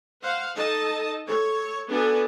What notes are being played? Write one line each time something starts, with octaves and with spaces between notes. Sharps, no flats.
C5 F5 F#5
D#4 A4 D#5 A5
A4 C#5
B3 D4 F#4 A4 G#5